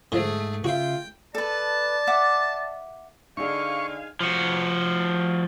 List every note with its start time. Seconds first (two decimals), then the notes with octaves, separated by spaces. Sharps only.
0.12 G#2 D3 F3 A3 G#4
0.64 C#3 F4 F#4 C#5 E5 F5 G5
1.35 A4 B4 D5 A5
2.07 E5 F#5 D6
3.37 D3 D#4 G#4 F5 G#5 C#6
4.21 F3 F#4